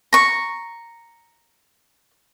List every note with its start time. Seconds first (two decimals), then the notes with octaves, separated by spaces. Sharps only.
0.13 A#5 C#6